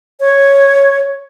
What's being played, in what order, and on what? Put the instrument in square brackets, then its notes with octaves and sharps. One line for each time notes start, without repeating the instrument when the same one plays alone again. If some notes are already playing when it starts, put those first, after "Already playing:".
[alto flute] C#5